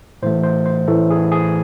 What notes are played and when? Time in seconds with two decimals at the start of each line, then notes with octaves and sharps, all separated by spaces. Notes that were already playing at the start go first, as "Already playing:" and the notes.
0.22 A2 E3 A3 C5
0.43 C5
0.66 C5
0.88 A2 E3 A3 A4
1.10 G#4
1.32 G#4